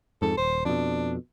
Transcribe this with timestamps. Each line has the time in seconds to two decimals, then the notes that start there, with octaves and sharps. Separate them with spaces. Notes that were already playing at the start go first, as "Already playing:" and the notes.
0.22 F2 G#2 A4
0.37 D#1 C5
0.65 F2 B2 D4